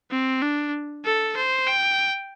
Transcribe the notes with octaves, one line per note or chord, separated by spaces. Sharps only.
C4
D4
A4
C5
G5